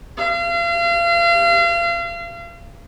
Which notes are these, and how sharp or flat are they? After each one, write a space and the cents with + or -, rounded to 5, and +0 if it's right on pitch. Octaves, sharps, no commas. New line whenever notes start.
F5 -35